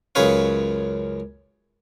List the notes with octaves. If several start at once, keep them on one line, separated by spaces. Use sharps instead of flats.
C#2 F#2 G#4 B4 C#5 F5